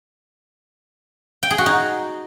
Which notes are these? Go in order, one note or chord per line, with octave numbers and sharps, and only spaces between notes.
G5
G#4
F#4
D#4